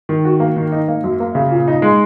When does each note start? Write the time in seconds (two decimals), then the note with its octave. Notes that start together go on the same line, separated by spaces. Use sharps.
0.09 D#3
0.25 F#4
0.40 A#3
0.56 D#3
0.72 D#4
0.88 A#3
1.04 F#2
1.20 A#3
1.35 C#3
1.51 A#2
1.68 D#4
1.82 G#3